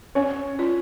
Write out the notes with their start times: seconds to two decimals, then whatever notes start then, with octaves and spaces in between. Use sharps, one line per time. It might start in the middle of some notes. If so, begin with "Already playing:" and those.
0.15 C#4 C#5
0.59 F4